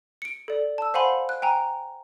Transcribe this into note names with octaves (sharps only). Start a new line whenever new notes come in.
C#7 D7
A4 D5
A5 E6
C5 F5 F#5 G#5 B5 C6
F#6
G5 G#5 A#5